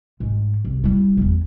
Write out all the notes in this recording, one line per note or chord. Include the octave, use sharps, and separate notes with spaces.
G#2 A3
C2
G3 E4
D#1 E2